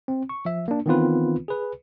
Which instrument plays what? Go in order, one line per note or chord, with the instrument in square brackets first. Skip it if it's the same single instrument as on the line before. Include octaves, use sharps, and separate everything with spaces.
[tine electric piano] C4
C#6
F3 E5
A#3 D4
D#3 E3 B3 C4 F4 B4
G#4 B4